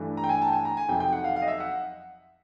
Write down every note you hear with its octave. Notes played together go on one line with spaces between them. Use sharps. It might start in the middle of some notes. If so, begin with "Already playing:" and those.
Already playing: G2 E3 A3
A#5
G5
G#5
A5
G5
G#5
A#5
G#5
F2 C3 D#3 F#3 G5
G5
F#5
F5
F5
D#5
E5
F#5